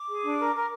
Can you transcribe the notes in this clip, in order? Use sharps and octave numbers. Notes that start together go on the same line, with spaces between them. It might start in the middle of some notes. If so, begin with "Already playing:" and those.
Already playing: D6
G#4
D4
A#4
A#4